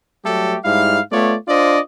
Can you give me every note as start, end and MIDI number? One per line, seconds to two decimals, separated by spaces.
0.23 0.56 54
0.23 0.56 55
0.23 0.56 57
0.23 0.56 67
0.23 0.56 69
0.63 0.99 44
0.63 0.99 55
0.63 0.99 64
0.63 0.99 77
1.11 1.35 57
1.11 1.35 59
1.11 1.35 65
1.11 1.35 73
1.11 1.35 74
1.48 1.78 62
1.48 1.78 65
1.48 1.78 72
1.48 1.78 74
1.48 1.78 75